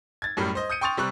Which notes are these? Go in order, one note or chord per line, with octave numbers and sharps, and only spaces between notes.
G#6 A6
F#2 A2 G3
C5 D#5
D#6 G6 C#7 D#7
G5 C6 C#6 D#6 A6 F7
C3 G3 C#6 F#6